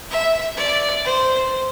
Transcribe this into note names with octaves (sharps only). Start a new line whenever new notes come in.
E5
D5
C5